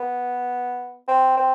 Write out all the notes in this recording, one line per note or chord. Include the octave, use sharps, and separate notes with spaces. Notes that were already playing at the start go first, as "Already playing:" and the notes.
Already playing: B3
C4
C4